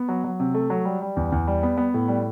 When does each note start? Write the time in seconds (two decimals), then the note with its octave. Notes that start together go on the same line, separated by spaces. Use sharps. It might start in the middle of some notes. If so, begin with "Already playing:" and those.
Already playing: B3
0.08 F#3
0.24 F#3
0.40 C3
0.54 A3
0.70 F#3
0.85 G3
1.02 G3
1.17 E2
1.32 E2
1.47 G3
1.63 B3
1.77 B3
1.94 A2
2.08 G3